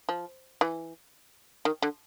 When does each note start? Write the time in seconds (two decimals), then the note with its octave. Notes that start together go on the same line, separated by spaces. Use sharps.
0.09 F3
0.61 E3
1.65 D#3
1.82 D3